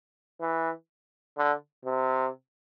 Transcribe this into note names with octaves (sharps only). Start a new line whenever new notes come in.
E3
D3
C3